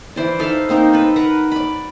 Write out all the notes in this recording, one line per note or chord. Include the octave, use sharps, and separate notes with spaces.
E3 C5 D5
D#4 A4 E5 F5
A#3 C4 D#4 A#4
A4 B4
A#4 B4 F#5 A#5
D5 B5